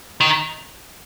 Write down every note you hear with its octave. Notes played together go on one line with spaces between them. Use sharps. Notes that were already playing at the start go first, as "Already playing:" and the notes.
D#3